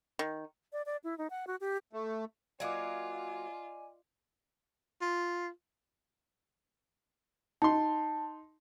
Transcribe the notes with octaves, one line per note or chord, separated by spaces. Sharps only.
D#3
D5
D5
E4
D#4
F#5
F#4
G4
A3
F#3 A#3 F4 D5 D#5 G#5 D6
F4
D#4 A5 C6